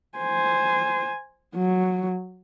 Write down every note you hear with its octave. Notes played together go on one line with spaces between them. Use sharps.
C5 G#5
F#3